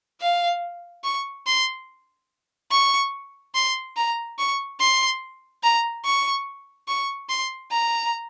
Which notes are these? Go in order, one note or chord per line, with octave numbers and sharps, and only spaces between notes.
F5
C#6
C6
C#6
C6
A#5
C#6
C6
A#5
C#6
C#6
C6
A#5